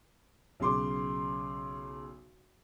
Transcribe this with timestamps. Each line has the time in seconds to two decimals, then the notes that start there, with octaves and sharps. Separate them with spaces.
0.60 B1 C#3 C6 D6